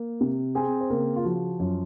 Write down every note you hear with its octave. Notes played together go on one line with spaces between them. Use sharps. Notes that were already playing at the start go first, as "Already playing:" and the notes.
Already playing: A#3
C3
C4 G#4 G#5
C5
C#3 A#3 A#4
F4
F3 F#4
F#2 F4